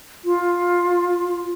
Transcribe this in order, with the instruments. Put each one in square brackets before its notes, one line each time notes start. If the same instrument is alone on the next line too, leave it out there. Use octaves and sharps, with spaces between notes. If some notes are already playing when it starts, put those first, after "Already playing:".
[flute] F4